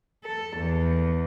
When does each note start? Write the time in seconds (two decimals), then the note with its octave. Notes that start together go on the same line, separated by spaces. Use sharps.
0.24 A4
0.57 E2